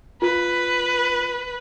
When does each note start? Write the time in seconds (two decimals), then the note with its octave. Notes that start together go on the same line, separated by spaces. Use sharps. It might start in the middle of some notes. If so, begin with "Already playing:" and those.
0.22 F4 B4